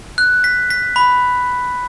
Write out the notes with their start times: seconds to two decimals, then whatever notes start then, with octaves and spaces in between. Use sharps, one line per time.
0.18 F#6
0.44 B6
0.70 B6
0.96 B5